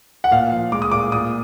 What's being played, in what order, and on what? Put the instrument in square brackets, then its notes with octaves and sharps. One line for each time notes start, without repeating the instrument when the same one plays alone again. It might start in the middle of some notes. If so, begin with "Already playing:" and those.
[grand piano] F#5
A#2 F5
F3
G#3 D6
D#6
A#2 D6
A#2 D#6